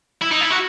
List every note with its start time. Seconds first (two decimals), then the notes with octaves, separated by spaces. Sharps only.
0.22 E4
0.31 D#4
0.41 E4
0.50 F#4